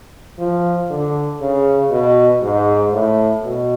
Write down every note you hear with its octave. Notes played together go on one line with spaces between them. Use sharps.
F3
D3
C#3
B2
G#2
A2
B2